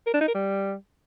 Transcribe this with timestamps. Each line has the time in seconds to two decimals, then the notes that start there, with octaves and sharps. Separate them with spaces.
0.07 A#4
0.14 D4
0.21 D#4
0.28 A#4
0.35 G3